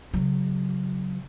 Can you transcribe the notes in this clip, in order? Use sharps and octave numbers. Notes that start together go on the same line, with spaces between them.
C#3 F#3